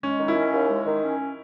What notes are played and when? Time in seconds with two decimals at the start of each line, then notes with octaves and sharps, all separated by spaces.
0.03 G#3 C#4
0.19 D#3
0.28 E4
0.36 C#4
0.52 D#2
0.69 G#3
0.86 D#3
1.02 C#4